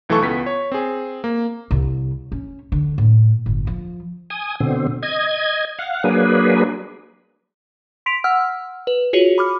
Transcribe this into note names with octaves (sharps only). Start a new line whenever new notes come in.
B1 E3 A3 A4 C#6
C#2 B3 B6
C#5
C4 G#4
A#3
C2
C#4
D3
A2
G1
F3
G#5 D#6
B2 D3 C4
D#5 G#6
F5 F#5
F#3 A#3 D4 G#4 B4
C6 B6 D7 F7
F#5 E6 F6
B4
F4 F#4 G#4 C#5
B5 D6 F6